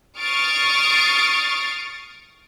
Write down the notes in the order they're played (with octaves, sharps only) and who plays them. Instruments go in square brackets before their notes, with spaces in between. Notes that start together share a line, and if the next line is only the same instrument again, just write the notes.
[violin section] C#6 D#6 F6 A6 C7 D7